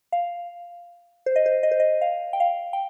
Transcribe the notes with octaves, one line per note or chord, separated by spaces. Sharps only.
F5
C5
D#5
C5
D#5
C5
D#5
F5
G5
F5
G5